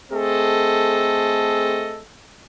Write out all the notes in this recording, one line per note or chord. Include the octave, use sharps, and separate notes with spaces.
A3 C4 G#4 A4 D#5